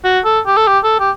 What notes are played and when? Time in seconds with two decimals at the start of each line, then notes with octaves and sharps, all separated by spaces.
0.04 F#4
0.25 A4
0.47 G4
0.57 A4
0.67 G4
0.84 A4
1.00 G4